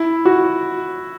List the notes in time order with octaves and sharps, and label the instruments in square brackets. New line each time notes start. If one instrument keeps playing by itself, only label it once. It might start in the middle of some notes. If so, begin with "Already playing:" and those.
Already playing: [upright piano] E4
F#4